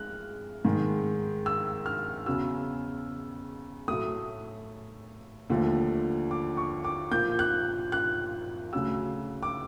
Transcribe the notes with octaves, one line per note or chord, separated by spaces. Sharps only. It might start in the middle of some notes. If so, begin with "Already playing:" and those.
Already playing: G#3 F6 F#6
G#2 D#3 G#3
E6
F6
E2 C#3 F#3 E6
A2 F#3 A3 D#6
D#2 D3 F3 A3
D6
C#6
D6
A#2 F3 A#3 G6
F#6
F#6
D2 C#3 F#3 E6
D6